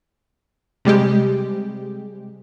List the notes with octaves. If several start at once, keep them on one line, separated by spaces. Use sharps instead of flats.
C3 G3 G#3 G4